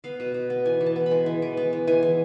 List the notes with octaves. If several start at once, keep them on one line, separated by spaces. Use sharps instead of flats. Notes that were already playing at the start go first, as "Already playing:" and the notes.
B3 F5
B2
B2
B3
E3 G#5
E3
A5
B3
B5
G#3
E3
E3
B3
G#3
E3 G#5
E3